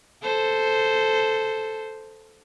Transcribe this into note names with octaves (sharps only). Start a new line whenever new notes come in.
A4 C5